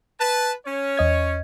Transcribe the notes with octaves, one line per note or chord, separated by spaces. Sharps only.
B4 A5
C#4 C#5
E2 D#5 G#6